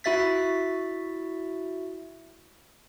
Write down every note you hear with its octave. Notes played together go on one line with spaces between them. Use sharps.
E4 F#4 E5 A6 B6